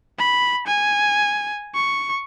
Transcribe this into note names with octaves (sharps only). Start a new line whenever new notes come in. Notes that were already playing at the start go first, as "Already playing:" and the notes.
B5
G#5
C#6